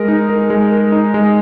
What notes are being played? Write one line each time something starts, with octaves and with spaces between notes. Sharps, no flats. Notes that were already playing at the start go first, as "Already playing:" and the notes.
Already playing: G#3 A#4
D#4
A#4
G#3
A#4
D#4
G#3